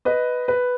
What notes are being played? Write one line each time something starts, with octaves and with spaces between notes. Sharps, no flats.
B4 D#5
B4